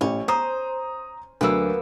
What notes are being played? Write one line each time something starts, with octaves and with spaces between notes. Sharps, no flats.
A1 C#4
C5 A#5 D#6
D2 F#3 A#3 B3 E6